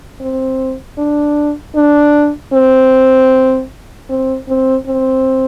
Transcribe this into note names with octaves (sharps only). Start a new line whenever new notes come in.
C4
D4
D4
C4
C4
C4
C4